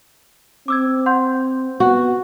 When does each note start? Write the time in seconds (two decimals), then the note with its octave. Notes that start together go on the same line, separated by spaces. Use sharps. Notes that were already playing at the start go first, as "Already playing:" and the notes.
0.68 C4 D6 E6 G#6
1.06 F#5 C6 G6
1.80 B3 F#4